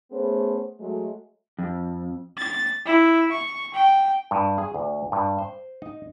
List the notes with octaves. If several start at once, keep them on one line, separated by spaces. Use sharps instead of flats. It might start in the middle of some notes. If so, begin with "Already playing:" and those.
A3 B3 C#4 G#4 C5
F#3 G#3 A3
F2
A6
E4
C#6
G5
G2
G#4
D2
G2
C5
D#4